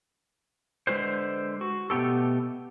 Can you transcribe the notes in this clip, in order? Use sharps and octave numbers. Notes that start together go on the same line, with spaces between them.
D3 G#3 F#4 B4 C5
F#4
B2 A3 B3 G4 A4